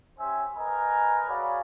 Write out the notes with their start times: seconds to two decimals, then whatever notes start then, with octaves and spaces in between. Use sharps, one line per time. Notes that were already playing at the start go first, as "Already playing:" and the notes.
0.19 C#4 G4 C5 E5 G#5
0.56 A#4 B4 D#5 G#5 A#5
1.29 F#4 G#4 C#5 D5 F5 B5